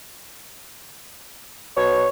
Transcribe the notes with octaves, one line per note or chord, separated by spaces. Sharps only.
B2 C#5